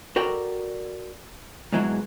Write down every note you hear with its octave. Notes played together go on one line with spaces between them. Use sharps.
F#4 A4 A#4 D5 G5
G#2 B2 E3 F#3 G#3